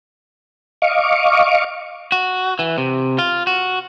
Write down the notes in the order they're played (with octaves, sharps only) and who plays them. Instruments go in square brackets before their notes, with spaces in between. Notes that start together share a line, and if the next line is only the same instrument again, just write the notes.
[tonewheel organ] D#5 F5 C#6 D6
[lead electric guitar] F#4
E3
C3
F4
F#4